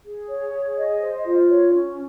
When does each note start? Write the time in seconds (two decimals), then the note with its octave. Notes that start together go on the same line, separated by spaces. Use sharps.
0.05 G#4
0.28 C#5
0.53 G#4
0.76 D#5
1.01 C5
1.25 F4
1.49 C#5
1.73 C#4